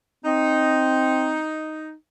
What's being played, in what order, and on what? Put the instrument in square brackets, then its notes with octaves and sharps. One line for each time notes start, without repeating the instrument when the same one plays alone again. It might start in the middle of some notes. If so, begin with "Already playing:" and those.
[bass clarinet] C4 [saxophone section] D#4